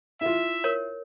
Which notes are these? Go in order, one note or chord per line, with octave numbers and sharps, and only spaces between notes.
E4 F4 E5
A#4 C#5